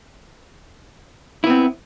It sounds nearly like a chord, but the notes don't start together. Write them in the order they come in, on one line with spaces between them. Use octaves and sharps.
E4 B3 C4